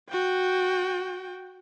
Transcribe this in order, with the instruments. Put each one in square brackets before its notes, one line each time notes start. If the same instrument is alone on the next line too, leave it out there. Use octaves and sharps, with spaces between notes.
[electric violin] F#4 G5